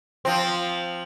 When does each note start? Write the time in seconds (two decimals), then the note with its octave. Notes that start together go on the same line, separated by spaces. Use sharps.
0.25 F3 C4